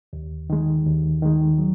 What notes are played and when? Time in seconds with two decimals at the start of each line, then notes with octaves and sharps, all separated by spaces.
0.13 D#2
0.50 D#3 G#3
0.86 D#2
1.22 D#3 G#3
1.58 F#3